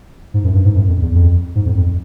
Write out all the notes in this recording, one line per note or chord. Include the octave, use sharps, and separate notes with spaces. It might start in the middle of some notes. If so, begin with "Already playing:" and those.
G#2
F#2
G2
G#2
F#2
F2
E2
F2
G#2
F2
F2